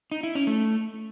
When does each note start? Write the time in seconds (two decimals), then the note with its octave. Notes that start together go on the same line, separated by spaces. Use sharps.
0.11 D#4
0.23 E4
0.35 C#4
0.47 A3